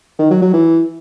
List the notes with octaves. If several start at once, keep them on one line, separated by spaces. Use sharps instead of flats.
D#3
F#3
F#3
E3